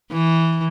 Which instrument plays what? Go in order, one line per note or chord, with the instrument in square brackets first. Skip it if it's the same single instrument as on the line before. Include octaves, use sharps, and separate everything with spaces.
[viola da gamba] E3